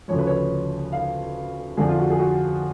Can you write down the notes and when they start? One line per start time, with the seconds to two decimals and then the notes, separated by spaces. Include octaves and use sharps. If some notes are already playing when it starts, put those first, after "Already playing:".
0.08 D2 C#3 F3 C#5
0.19 B4
0.27 C#5
0.92 F5
1.77 F2 D3 F3 G#4
1.88 F4
1.98 F#4
2.10 G#4
2.19 F#4